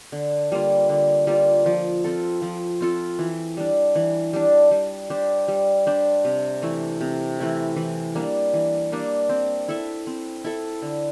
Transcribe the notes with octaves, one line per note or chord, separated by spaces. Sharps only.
D3
G3 A#3 F4
D3
G3 A#3 F4
F3
C4 F4 A4
F3
C4 F4 A4
E3
G3 D4
E3
G3 D4
G3
D4 G4 C5
G3
D4 G4 C5
C3
E3 A3 E4
C3
E3 A3 E4
E3
G3 A#3 D4
E3
G3 A#3 D4
C4
E4 A4 E5
C4
E4 A4 E5
D3